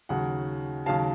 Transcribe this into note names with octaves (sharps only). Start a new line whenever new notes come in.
D#2 C#3 F#3 F#5
D#2 C#3 F#3 F5 A5